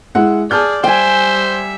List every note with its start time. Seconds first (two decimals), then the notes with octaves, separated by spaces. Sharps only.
0.15 G#3 E4 F#5
0.51 G#4 D5 A5 F6 G6
0.84 G3 C5 E5 G5 G#5